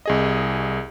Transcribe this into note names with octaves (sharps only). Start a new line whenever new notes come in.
C2 G#4 D#5